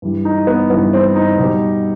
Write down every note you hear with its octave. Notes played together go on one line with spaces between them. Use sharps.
G2 E3 G3
D#4
B3
G2 E3 G3 B3
C4
D#4
B2 G3